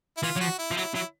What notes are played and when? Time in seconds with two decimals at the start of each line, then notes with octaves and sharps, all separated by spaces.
0.17 E4
0.23 E3 F4
0.37 F#3
0.41 F3 F#4
0.59 E4
0.71 F3
0.77 F#3 E4
0.95 F#3 E4